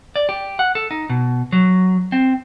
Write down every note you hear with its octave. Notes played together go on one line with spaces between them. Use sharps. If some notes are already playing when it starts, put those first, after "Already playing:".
D5
G4
F#5
A4
D#4
B2
F#3
C4